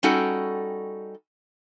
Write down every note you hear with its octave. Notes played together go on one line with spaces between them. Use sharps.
G3 C#4 D#4 F#4 A4 G5